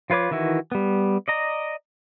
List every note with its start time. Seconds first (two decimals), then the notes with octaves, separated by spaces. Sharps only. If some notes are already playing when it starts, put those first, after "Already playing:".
0.10 F3 F4 B4 C#5 D6
0.31 D#3 E3 E4 F#4
0.72 G3 B3
1.28 D5 D#5 A#5